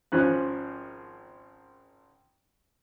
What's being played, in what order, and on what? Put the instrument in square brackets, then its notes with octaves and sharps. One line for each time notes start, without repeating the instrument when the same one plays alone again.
[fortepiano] G#1 F3 C#4 F#6